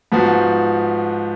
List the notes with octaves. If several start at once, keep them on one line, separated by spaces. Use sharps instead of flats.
G#2 F3 B3 F#4